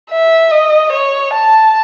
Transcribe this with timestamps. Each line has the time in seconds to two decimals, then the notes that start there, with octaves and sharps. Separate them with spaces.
0.11 E5
0.52 D#5
0.92 C#5
1.35 A5